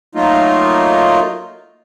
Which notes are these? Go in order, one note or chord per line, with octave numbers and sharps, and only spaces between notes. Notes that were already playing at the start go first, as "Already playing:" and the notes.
F#3 A3 A#3 D#4 F4